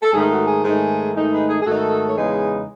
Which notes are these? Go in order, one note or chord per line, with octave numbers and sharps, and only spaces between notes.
A4
G#2 D#3 A3 D#4 G#4
F#4 A4
G#4
G#2 D#3 A3 D#4 G#4
G#2 D#3 A3 D#4
G#4 B4
G#4
G#4
G#2 D#3 A3 D#4 F#4 A4
C#5
E2 C#3 G#3 D#4 G#4 B4